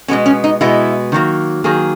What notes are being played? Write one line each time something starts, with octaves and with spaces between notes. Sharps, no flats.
B2 G#3 B3 C#4
C#4
D#4
B2 G#3 B3 E4
D#3 F#3 A#3
D#3 F#3 A#3 G#4